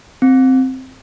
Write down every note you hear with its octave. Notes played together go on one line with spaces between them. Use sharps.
C4